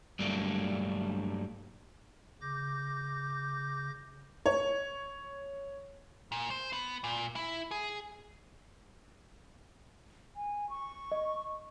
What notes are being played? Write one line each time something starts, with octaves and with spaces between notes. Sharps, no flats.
G2 F#3 G3 A3 A#3 D4
C#3 D6 G6 A#6
C#5
A#2
C5
B3
A#2
E4
G#4
G#5
C#6
D#5